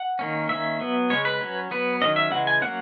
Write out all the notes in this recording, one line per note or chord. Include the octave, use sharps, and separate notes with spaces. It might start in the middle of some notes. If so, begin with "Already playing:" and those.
Already playing: F#5
D#3 A#3 C#4
D#3 A#3 C#4 E5
F#3 B3
C#3 G#3 C#4 C#5
B4
F#3 C#4
F#3 B3 B4
D#3 F#3 C#4 D#5
E5
C#3 E3 G#3 F#5
G#5
F#3 A#3 C#4 F#5